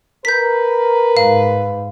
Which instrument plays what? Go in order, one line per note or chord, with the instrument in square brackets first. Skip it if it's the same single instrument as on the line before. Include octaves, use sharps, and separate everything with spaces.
[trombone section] A#4 [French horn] B4 [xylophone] G6 B6
[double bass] G#2 [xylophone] F5